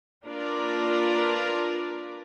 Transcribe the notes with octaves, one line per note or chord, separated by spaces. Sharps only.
A#3 D4 F4 A#4 B4 D5